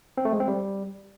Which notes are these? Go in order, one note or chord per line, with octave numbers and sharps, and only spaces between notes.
C4
A3
G#3
C4
G3